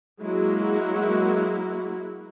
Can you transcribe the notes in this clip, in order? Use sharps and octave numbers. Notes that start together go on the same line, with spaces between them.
F#3 G#3 A#3 E4 F#4